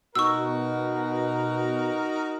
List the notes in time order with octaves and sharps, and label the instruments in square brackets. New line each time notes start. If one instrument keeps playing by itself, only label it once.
[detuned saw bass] B2 [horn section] D#4 F#4 A#4 [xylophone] C#6 E6